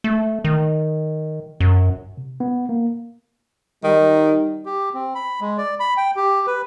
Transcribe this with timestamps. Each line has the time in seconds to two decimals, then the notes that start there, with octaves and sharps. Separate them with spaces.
0.04 A3
0.44 D#3
1.60 F#2
2.17 C3
2.40 B3
2.69 A#3
3.84 D#3 G3 D#4
4.65 G4
4.94 C4
5.15 B5
5.41 G#3
5.58 D5
5.80 B5
5.97 G5
6.16 G4
6.47 B4